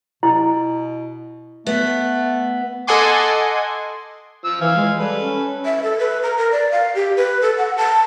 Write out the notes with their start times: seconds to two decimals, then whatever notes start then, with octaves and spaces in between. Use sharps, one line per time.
0.23 B2 E4
1.67 A3 B3
2.87 A4 D#5 F#5 G#5 C6 D6
4.44 F3 E6
4.61 E3 F5 G#5
4.76 G#3
4.99 G3 A4 B4
5.19 C#4
5.65 E5
5.83 A4
5.99 B4
6.23 A#5
6.38 A#4
6.52 D5
6.71 F5
6.95 G4
7.16 B4
7.42 A4
7.57 F#5
7.77 A5